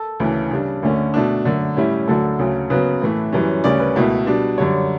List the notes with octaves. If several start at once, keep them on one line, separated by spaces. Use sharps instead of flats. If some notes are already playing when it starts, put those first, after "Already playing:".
Already playing: A4
D2 C#3 E3
C#3 G3 D4
D2 D3 A3 C#4
B2 A3 D4
F#2 D3 A3
A2 G3 C#4 E4
D2 D3 F#3 A3 A4
D2 C#3 F#3
C#3 F#3 B3 B4
A2 E3 A3
F#2 E3 G3 C#4
D2 C#3 G3 C#4 D5
B4
C#2 B2 A3 E4
B2 G3 D4
F#2 D3 G3 C#5